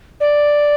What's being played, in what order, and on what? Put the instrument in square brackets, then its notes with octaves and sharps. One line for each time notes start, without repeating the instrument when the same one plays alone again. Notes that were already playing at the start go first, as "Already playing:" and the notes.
[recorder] D5